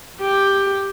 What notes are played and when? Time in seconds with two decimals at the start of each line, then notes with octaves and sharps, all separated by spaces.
0.21 G4